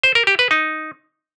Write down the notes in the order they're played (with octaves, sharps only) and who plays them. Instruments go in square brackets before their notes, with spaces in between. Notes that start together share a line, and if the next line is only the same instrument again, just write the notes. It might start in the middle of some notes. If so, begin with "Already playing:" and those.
[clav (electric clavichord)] C5
A#4
G4
B4
D#4